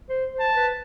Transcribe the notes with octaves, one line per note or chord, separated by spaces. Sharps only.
C5
C5
A5
B4